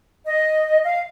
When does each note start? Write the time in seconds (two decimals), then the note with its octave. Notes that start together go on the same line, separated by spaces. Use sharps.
0.25 D#5
0.84 F5